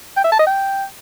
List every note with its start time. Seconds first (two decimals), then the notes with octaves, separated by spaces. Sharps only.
0.17 G5
0.24 E5
0.32 A5
0.39 D#5
0.47 G5